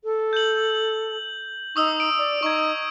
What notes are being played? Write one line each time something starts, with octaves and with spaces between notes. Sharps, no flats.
A4
G6 F#7
D#4 C#6 D#6 E6
D7
D5
D#4 C#6 G#6